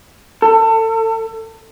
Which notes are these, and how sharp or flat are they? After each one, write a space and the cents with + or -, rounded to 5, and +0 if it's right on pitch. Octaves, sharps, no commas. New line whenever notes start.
A4 +30